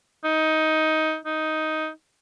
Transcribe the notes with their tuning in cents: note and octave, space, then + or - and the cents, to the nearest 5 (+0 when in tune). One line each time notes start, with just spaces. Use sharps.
D#4 +15
D#4 +10